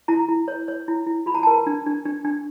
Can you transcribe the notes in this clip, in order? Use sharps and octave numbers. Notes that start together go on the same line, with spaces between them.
E4 A#5
E4
C#5
C#5
E4
E4
F4 B5
A#5
A5
A#4 A#5
D4
D4
D4
D4